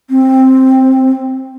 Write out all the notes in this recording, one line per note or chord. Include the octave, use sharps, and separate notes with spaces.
C4